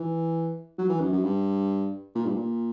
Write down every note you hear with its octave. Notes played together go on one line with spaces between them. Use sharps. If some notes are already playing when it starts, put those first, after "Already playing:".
Already playing: E3
F#3
E3
F#2
F#2
G2
A#2
G2
A#2